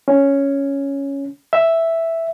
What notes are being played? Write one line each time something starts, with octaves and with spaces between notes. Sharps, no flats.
C#4
E5